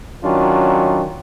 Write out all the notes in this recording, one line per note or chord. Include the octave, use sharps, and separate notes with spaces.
D#3 F#3 C#4 D4 F4